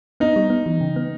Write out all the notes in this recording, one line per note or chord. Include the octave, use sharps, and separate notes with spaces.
B3 D#4
G3
B3
E3
C#3
B3